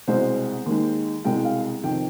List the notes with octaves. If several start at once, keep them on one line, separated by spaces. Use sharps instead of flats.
C2 B2 G#3 C5
D#2 D#3 G#3
C2 B2 G#3 G5
F5
F2 C3 D#3 G5